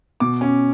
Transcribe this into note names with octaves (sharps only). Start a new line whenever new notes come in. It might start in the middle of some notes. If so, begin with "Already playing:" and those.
B2 D6
C#4